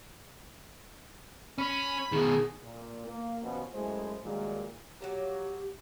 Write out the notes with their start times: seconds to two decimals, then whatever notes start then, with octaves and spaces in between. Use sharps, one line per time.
1.58 C#4 B5
2.12 B2 D#3 G#4
2.64 A#2
3.07 A#3
3.42 D#2 B2 F3 C#4 F4 F#4
3.74 F#2 A2 G#3 A3 C5
4.24 G2 A#2 D#3 F#3 G#3
5.01 F#3 G3 A#3 G4